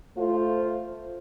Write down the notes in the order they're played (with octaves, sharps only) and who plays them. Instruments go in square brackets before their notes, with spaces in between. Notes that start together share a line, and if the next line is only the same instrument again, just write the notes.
[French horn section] A3 F4 C5